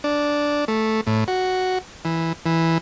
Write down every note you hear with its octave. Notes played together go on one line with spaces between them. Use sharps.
D4
A3
A2
F#4
E3
E3